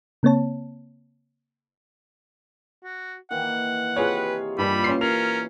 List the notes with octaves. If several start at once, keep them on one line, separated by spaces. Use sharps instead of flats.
C#3 A#3 C4 C#5 A5
F#4
D#3 E3 A#3 F#5
C3 F4 G#4 B4 C#5
G2 A#2 E3 G3 B5
C#4 C6 C7
C#4 A#4 F7